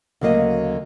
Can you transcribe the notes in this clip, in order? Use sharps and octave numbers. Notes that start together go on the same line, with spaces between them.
D2 C#3 F#3 A#3 D#5